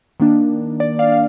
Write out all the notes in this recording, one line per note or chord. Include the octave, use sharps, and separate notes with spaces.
D#3 A#3 D4
D5
D5 F5
F5